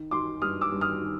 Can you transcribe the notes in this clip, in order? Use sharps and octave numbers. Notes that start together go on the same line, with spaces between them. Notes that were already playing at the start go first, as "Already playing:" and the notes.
Already playing: D#3
D#3 C6 D6
G2 D#6 F6
D6 E6
G2
D#6 F6
D#3